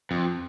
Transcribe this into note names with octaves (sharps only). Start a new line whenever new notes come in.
F2